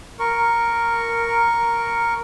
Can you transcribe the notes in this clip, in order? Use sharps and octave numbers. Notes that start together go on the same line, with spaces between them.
A#4 C#6